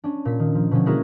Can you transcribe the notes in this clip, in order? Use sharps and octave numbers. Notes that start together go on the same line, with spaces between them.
C#4 D4
A#2 B6
D#3
F3
B2 D3 F3 C#4
G#3 A#3 E4 F#4 G#4 A#4